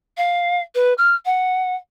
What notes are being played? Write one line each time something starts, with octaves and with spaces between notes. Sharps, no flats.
F5
B4
F6
F#5